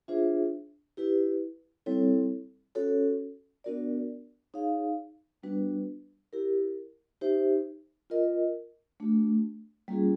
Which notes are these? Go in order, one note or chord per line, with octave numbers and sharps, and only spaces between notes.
D4 F4 G#4 C5 E5
E4 G4 B4
G3 C4 E4 A4 C#5
C#4 F#4 A4 C#5
B3 D4 F#4 A#4 D5
D#4 G#4 C#5 F5
G3 B3 D4 F#4 B4
E4 G4 A#4
D#4 G4 C5 E5
F4 A#4 D#5
A3 D4 F#4
G3 A#3 C#4 F4 G#4